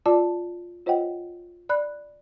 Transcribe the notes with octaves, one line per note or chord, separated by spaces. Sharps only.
F4 D5 A5 D6
F4 C5 C#5 D#5 F#5 G5
D5 B5 F#6